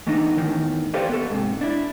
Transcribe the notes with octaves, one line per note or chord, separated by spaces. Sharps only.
E3 A3 B3 D4 D#4
E2 A2 D#3
G4 A4 B4 C5 D5 F5
B3 A4
G#2 C3
D4 E4